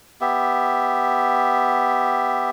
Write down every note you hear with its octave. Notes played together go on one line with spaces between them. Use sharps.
B3 G4 E5